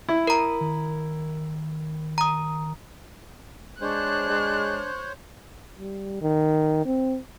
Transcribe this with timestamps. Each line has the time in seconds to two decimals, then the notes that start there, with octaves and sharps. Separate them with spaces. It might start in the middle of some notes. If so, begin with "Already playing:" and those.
0.09 E4
0.27 A#4 A#5
0.61 D#3
2.18 A#5 D#6
3.81 G#3 D4 C5 C#5 F#6
4.29 G#3
5.79 G3
6.22 D#3
6.85 C4